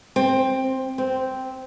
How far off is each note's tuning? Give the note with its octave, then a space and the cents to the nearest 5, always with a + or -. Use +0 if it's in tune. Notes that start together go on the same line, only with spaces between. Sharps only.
C4 +10
C4 -5